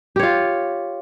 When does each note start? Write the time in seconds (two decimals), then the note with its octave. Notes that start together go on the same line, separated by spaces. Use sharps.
0.16 G4
0.19 C#5
0.23 F4